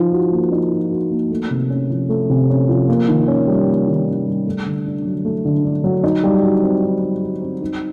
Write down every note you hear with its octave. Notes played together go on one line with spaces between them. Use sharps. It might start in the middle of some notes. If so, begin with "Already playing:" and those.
Already playing: F3 D#4
F#4
A#3
D#4
F3
F#4
A#3
A3
C3
C#4
F3
A3
C3
C#4
F3
A#3
D#3
C#4
G3
A#3
D#3
C#4
G3
A3
D3
D4
F#3
A3
D3
D4
F#3
D#4
G3
F#4
C4
D#4
G3
F#4
C4
D#4